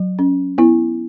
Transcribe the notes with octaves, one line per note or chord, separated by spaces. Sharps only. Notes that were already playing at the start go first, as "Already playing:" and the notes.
Already playing: F#3
C#4
B3 E4